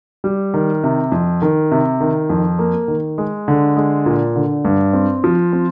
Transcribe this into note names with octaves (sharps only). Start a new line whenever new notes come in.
G3
D#3
C3
F2
D#3
C3
D#3
F2
A#3
D#3
G#3
D3
G#3
A#2
D3
G2
C4
F3
C4